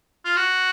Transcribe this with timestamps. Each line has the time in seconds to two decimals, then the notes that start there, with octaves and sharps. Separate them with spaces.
0.25 F4
0.36 F#4